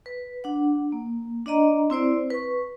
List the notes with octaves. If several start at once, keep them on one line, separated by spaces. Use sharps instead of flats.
B4
D4 F#5
A#3
D4 D5 D#5 A#5
C4 E4 C5 D5
B4 C#6